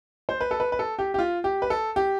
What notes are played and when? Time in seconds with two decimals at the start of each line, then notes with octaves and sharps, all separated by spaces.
0.29 C5
0.41 B4
0.51 A4
0.60 B4
0.72 B4
0.79 A4
0.99 G4
1.14 G4
1.19 F4
1.44 G4
1.62 B4
1.70 A4
1.96 G4